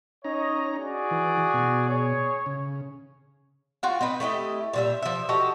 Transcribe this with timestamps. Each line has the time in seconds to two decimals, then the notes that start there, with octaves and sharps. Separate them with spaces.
0.24 C#4 D#4 C#5 D#5 A#5
0.76 F#4 G#4 D5
1.11 E3
1.54 B2
1.89 G#4 C#5
2.46 C#3
3.83 F4 F#4 G5
4.01 C4 D#4 B4
4.20 A3 E4 G4 D#5
4.73 A#2 G3 E5
5.02 F3 E5
5.29 F#4 G4 A4 D#5